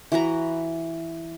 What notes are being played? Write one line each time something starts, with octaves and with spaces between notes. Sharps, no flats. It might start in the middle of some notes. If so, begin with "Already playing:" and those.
E3 F#4 B4 A#5